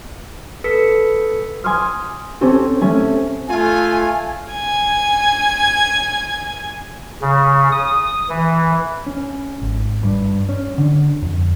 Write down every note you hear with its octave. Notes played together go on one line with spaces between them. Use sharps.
A4 B4 E6 B6 C#7
G#5 C6 D6 D#6 F6
C4 C#4 G4 A4
A3 C#4 A4 G#5
A3 F4 G#5
G#5 G#6
C#3
D#6
E3
C#4
G#1
G2
C#4
D3
F2